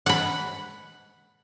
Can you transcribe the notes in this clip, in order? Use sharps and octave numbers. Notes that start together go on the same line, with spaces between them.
F#5 B5